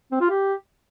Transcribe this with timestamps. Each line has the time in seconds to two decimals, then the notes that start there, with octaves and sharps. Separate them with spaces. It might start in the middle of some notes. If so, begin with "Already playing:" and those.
0.12 C4
0.21 F4
0.30 G4